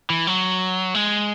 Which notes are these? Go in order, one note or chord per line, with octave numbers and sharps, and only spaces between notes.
E3
F#3
G#3